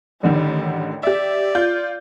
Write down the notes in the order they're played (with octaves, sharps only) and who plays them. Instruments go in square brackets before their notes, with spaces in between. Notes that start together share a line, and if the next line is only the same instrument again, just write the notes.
[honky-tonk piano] A1 D3 D#3 [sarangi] G3
[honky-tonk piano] G4 E5 [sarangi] D5
[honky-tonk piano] F4 G6